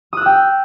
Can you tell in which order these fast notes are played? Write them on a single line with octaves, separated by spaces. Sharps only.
D#6 F#6 E6 G5